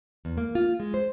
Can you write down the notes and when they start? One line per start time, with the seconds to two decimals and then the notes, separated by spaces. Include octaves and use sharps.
0.25 E2
0.38 A#3
0.55 F4
0.80 G#3
0.94 C5